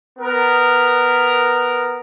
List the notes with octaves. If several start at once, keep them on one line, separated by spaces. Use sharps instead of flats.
B3 A#4